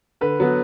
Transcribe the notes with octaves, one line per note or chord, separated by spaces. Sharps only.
D3 B4
F#3 B3